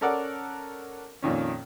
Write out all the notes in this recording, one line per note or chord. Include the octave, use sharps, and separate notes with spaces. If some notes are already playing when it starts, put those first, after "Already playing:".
C#4 A4 A#4 D5 F#5
F2 A#2 D#3 C#4